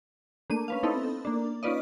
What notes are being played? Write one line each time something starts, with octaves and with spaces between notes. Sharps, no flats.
A3 A#3 D4 D#7
C#4 B4 F5
B3 C4 D#4 E4 A4
A#3 D4
C#4 D#4 F4 B4 D5 D#5